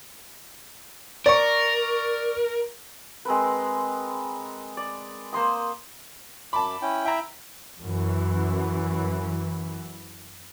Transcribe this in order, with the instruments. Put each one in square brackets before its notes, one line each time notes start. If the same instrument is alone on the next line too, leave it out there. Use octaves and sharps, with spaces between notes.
[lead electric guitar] A#4 [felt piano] D5 C#6
[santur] G#3 C4 A#4 B4
D5
A#3 C5 C6 D#6
[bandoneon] F#2 D6 [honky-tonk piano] A5 B5
[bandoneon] C#4 E4 G5
[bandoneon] E4 E5 [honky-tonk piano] G5 A#5
[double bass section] F#2 E3